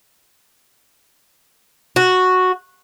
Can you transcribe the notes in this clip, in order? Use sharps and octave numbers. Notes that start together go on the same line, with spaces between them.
F#4